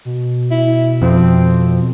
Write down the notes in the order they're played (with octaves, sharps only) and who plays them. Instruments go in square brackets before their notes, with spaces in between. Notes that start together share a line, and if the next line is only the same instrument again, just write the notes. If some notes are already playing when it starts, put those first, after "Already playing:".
[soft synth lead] B2
[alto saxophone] E4
[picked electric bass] F2 [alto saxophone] C4